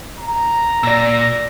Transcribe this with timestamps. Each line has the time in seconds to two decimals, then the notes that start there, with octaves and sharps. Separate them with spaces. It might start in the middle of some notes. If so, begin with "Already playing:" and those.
0.19 A#5
0.83 A#2 D5 E6 A#6